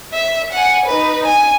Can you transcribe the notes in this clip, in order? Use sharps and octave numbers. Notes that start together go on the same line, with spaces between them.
E5
F#5 G#5
D#4 B4
G#5